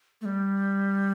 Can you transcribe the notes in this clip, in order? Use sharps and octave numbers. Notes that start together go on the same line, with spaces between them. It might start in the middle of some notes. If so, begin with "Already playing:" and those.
A3
G3